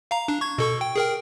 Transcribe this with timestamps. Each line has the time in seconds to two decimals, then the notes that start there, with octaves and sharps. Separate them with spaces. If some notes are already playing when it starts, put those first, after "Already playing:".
0.11 F5 A#5
0.28 D4
0.41 C#6 G#6
0.58 B2 A4 C#6
0.81 G5
0.96 G#4 A#4 G5